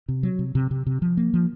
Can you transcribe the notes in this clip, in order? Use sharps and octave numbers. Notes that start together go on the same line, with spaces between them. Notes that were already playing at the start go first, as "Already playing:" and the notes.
C3
F#3
C3
C3
C3
C3
F3
A#3
F3